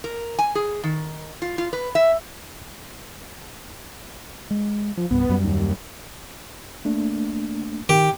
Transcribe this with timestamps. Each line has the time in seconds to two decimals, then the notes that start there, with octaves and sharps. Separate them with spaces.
0.04 A#4
0.39 G#5
0.55 G#4
0.84 D#3
1.42 F4
1.58 F4
1.73 B4
1.95 E5
4.51 G#3
4.97 F3
5.11 C2 G2 B3
5.29 F#2 G3
5.44 D#2
6.85 A3 A#3 D4
7.89 D#3 G4